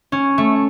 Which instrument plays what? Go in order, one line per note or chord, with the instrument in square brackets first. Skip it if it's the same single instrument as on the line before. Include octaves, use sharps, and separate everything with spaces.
[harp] C#4
A3